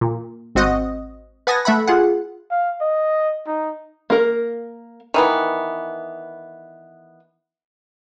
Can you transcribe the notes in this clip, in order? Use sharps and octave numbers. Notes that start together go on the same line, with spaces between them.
A#2
G#1 C4 F#4 D#5
B4 F#5 G#5 A5 D#6 A#6
A3 E5 F#5 B5
F4 G#4 F#5
F5
D#5
D#4
A#3 A#4
D#3 E3 B3